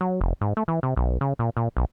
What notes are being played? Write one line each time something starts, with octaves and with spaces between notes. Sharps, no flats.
F#3
F1
G#2
A3
E3
C3
B1
C#3
A#2
A#2
B1